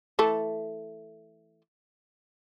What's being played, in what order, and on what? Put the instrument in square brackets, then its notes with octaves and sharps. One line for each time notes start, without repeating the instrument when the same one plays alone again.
[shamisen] E3 A3 A4